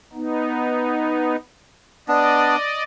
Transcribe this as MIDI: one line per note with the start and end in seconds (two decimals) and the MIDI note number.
0.13 1.36 59
0.13 1.36 63
2.08 2.56 59
2.08 2.56 62
2.08 2.83 74
2.08 2.83 75